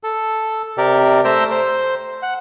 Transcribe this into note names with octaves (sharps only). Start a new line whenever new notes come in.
A4
C3 G4 A#4 D5
A3 C5 E5 A#5 E6 G6
C5
F#5